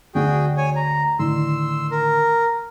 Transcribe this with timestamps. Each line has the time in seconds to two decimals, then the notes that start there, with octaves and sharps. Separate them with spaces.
0.15 D2 D3 F#4 G#4 G5
0.57 C#5 G#5
0.76 A#5
1.19 A2 D3 D#3 C6 E6
1.91 A#4